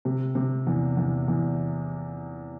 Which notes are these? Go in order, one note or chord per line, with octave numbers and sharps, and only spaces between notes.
C3
C3
E2
E2
E2